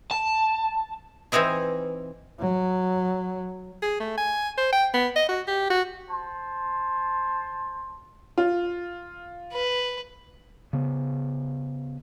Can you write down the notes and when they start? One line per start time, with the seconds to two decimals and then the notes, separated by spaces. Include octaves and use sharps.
0.11 A5
1.32 E3 C4 D#4 E4 G#4
2.40 F#3
3.83 G#4
4.00 A3
4.18 G#5
4.58 C5
4.73 G5
4.94 B3
5.16 D#5
5.29 F#4
5.48 G4
5.70 F#4
6.09 C5 A5 C6
8.38 F4
9.52 B4
10.73 C#3 B3